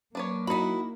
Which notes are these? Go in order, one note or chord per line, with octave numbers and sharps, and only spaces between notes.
F#3 A#3 D4 B4 C#5
D#4 E4 F#4 B5